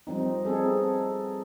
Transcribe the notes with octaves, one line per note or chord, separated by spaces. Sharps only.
F3 G3 C4 D#4
B3 C4 D#4 G#4 A4